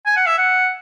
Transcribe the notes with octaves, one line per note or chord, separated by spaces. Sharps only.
G#5
F#5
E5
F#5